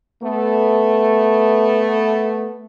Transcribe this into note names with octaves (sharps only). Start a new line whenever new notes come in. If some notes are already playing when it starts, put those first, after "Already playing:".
A3 B3